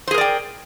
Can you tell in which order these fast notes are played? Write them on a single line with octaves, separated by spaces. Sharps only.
C5 G#4 A#4 D5 G5